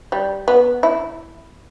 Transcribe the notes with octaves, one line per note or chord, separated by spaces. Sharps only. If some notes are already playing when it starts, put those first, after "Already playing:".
G3
B3
E4